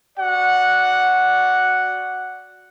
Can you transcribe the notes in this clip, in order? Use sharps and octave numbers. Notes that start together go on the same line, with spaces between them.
F#4 D5 F#5